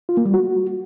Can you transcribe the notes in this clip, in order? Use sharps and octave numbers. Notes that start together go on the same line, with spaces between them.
F4
A#3
G3
F#4